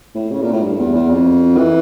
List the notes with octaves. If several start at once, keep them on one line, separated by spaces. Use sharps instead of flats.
A2
C#3
A#2
A2
G2
E2
E2
F2
E3